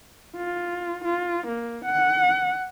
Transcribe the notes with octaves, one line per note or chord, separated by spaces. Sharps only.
F4
F4
A#3
F#5